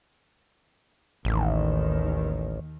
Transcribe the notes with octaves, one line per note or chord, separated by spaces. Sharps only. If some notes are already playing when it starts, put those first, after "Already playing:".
A1 D#2 D#3